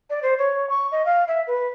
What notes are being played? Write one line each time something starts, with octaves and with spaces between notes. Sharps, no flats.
D5
C5
C#5
C#6
D#5
F5
E5
B4